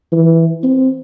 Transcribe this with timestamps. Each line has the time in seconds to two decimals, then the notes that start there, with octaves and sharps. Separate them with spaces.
0.12 E3
0.63 C4